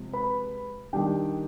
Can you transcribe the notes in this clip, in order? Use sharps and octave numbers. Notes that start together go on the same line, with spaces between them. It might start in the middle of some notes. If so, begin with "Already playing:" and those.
Already playing: C3 F3 G#3
B4 B5
D#3 G3 D4 G4 G5